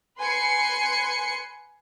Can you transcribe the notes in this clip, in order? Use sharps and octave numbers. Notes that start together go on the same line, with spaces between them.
B4 G#5 C6 C#7